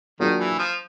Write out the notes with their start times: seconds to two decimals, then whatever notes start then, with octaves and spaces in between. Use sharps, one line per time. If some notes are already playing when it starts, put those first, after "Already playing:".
0.20 D#3 F#3 A#3 D4 F4 G#4
0.40 E3
0.58 F3